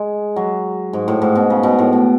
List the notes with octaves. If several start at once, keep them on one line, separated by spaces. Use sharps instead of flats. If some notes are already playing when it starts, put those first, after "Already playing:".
Already playing: G#3
F#3
G#2
A2
G#2
B2
C#3
B2
A2
B2